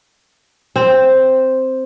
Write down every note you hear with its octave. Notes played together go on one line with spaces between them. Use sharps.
C4